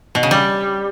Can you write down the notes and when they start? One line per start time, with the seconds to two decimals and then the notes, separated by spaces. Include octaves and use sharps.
0.15 B2
0.23 C#3
0.31 G3